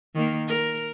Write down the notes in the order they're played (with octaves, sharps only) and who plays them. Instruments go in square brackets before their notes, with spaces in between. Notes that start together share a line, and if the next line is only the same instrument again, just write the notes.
[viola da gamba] D#3 A#3
A#4